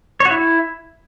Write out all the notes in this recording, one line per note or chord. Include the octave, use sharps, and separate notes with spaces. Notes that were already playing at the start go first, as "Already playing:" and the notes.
C#5
F#4
E4